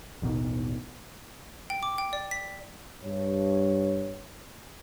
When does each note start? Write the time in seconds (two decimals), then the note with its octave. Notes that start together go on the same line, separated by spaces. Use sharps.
0.22 A1 D#2 B2 D#3
1.70 G5
1.83 D6
1.98 G5
2.13 D5
2.31 B6
3.03 G2 C#5